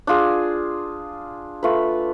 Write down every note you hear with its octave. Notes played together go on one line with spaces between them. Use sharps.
D4 F4 G#4
A3 F4 B4